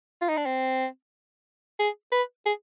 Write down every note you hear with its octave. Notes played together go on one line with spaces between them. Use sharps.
F4
D#4
D4
C4
G#4
B4
G#4